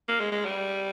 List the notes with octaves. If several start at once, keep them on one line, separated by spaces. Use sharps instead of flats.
A#3
G#3
G#3
G3